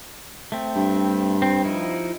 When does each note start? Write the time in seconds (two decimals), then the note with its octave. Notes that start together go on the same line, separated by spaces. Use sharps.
0.52 A3 C4
0.76 G2
1.42 C4
1.64 F3 D#4 E4